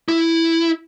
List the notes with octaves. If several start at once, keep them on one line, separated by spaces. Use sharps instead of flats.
E4